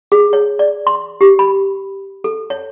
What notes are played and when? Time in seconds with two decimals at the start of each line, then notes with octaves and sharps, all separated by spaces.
0.12 G#4
0.33 C#5
0.59 D5
0.87 C6
1.21 G4
1.39 B5
2.24 A4
2.50 C#5